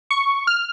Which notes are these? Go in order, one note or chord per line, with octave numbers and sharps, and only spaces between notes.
C#6
F6